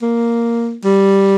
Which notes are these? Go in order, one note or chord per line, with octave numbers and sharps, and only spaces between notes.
A#3
G3